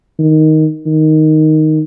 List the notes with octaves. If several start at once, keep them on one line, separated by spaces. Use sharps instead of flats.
D#3
D#3